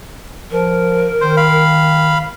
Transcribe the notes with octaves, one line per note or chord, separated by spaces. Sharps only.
F3 A#4
D#3 C5
F5 B5